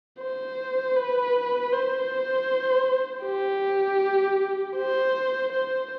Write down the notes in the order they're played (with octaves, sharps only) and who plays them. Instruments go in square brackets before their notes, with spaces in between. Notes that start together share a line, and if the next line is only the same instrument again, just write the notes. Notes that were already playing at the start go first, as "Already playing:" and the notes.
[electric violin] C5
B4
C5
G4
C5
C5